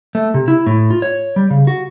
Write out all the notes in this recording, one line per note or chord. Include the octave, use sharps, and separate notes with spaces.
A3
C3
E4
A2
F4
C#5
G3
C#3
F#4